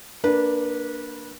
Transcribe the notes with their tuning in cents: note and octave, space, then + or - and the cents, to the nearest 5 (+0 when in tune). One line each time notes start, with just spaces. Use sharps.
A#3 +0 D4 +0 B4 -20